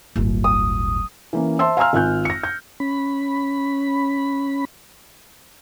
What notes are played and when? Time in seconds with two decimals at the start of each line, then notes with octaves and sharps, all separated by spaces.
0.16 D1 G1
0.44 D#6
1.33 E3 A#3 C#4
1.59 C5 E5 A5 C6 E6
1.77 F5 G#5 A#5 C6 E6 F6
1.93 G#1 F4 G#5 F#6 G6
2.25 A#6 C#7
2.43 G6
2.80 C#4 B5